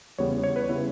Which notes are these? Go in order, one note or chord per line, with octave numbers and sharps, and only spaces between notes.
E2 C#3 G3 B3 E4 C#5
C#5
B4
C#3 G3 B3 E4